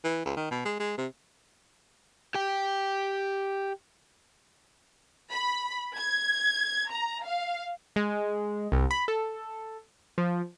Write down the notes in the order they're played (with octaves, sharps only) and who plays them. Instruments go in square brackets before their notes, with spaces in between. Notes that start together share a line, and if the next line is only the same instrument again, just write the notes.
[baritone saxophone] E3
C#2
D#3
B2
G#3
G#3
C3
[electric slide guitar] G4 G5
[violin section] B5
G#6
A#5
F5
[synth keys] G#3
C2
B5
A4
F3